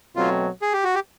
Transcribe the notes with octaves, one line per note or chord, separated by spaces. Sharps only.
B2 F#3 A3 C4 F4
G#4
G4
F#4
G4